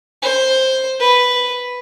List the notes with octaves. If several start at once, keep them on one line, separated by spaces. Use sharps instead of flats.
C5
B4